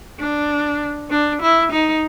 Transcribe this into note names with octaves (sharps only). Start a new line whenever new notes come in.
D4
D4
E4
D#4